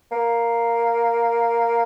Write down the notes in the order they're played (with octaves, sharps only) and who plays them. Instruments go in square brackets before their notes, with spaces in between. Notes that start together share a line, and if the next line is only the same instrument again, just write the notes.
[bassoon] A#3